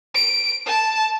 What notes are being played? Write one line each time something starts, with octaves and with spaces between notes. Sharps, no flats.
D7
A5